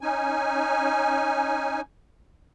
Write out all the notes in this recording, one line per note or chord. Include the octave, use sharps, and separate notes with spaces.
C#4 D#4 G#5